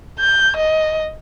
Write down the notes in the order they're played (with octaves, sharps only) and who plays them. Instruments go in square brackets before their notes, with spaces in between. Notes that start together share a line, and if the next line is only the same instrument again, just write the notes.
[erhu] G6
D#5